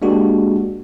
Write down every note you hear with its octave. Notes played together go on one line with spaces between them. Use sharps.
G#3 A#3 D4 F#4 G4